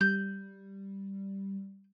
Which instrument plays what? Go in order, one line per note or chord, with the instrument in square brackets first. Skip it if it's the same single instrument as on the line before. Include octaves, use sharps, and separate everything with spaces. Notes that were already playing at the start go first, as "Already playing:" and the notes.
[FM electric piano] G3 [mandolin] G6